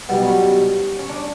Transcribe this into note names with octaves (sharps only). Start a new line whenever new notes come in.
B1 B2 G3 B3
C#4
C#4
D4